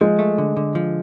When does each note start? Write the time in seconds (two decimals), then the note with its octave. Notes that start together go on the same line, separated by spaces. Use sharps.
0.01 F3 G#3
0.19 A3
0.38 D3
0.57 D3
0.75 F3